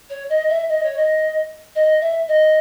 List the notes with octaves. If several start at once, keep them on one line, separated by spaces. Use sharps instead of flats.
C#5
D#5
E5
D#5
C#5
D#5
D#5
E5
D#5